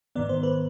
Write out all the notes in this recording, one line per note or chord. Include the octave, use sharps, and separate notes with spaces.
G#2 D#3 B3 D5
C5
B4